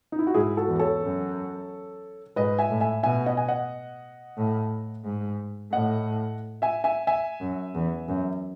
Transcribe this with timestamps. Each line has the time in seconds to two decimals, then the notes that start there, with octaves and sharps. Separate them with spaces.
0.12 D#4
0.19 E4
0.27 F#4
0.34 G#2 E4 G#4
0.57 F#4 A4
0.68 E2
0.79 A4 C#5
1.02 F#2
2.36 G#2 B4 D#5
2.59 E5 G#5
2.71 A2
2.81 E5 G#5
3.03 B2 E5 G#5
3.26 D#5 F#5
3.37 G#5
3.48 D#5 F#5
4.38 A2
5.05 G#2
5.73 A2 D#5 F#5
6.62 E5 G#5
6.84 E5 G#5
7.07 E5 G#5
7.41 F#2
7.74 E2
8.08 F#2